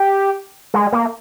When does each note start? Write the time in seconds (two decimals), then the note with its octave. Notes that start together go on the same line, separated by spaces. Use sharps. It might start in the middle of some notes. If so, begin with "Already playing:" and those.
Already playing: G4
0.74 G#3
0.92 A#3